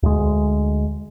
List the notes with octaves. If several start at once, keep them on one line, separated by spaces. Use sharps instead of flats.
D2 G#3